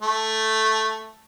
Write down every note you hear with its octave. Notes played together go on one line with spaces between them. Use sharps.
A3